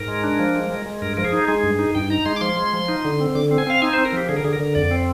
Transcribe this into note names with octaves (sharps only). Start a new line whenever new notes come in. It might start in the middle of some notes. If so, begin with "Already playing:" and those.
Already playing: G#2 A#4
G#3
D4
F3
G#3
G#3
G#3
G2 A#4
F3 A#4
G#4
D#4
G#3 G#4
G2
D#4
G2 G5
D#4 A#5
G#3 C6
D6
F3 C6
G#3
F3
D#4
D3
C4
D3 D6
C4
G#5
C4 F5
D#4 G#5
C4 C5
A#4
F3 G4
D3 G#4
A#4
D3 G#4
A#4
D3
F2 D5
C4